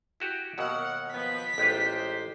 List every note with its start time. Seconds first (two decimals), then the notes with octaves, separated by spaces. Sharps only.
0.20 E4 F#4 G4
0.58 D#2 B2 F#3 F#4 A#4 F#5
1.13 F3 B3 B6
1.58 A1 G#3 D#4 F4 G4 C5